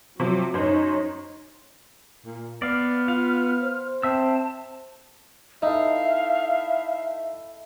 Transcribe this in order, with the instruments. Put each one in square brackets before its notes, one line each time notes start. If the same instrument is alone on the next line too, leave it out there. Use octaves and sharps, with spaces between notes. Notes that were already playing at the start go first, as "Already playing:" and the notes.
[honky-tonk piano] C3 F3 [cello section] F#3
[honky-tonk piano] F#2 C5 [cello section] D#4 C#5
[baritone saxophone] A#2
[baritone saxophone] B3 [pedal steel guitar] D5 F5 [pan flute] F6
[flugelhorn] F4 [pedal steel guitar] F5
[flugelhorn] C5
[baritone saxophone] C4 [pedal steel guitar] E5 E6 [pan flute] A5
[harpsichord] D#4 [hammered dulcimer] E4 A4 [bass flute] E5 [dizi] F5